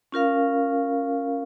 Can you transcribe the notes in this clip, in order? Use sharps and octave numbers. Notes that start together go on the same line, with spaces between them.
C#4 F4 A#4 F5